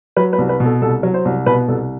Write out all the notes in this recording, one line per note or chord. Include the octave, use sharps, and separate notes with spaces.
F#3 B4
B4
C2
B4
B2
A4
C2 A4
F#3
C5
C2
B2 B4
C2 A4